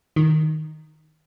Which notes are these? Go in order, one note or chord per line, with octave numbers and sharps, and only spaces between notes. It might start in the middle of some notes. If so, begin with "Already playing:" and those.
D#3